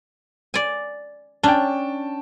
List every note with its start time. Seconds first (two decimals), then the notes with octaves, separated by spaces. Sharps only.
0.54 D5 G#5
1.43 C#4 D4 G5 A5